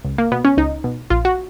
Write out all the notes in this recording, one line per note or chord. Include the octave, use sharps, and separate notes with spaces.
C#2
A#3
B2 B3
C#4
C#2 D#4
B2
A#1 F4
F#4